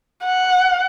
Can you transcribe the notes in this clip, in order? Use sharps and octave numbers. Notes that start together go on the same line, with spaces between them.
F#5